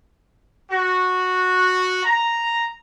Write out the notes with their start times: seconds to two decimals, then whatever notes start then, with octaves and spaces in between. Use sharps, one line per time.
0.71 F#4
2.04 A#5